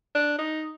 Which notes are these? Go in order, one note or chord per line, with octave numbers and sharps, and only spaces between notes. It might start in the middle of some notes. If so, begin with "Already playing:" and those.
D4
D#4